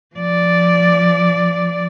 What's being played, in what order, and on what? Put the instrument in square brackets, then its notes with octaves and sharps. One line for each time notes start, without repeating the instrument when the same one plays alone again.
[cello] F3 D5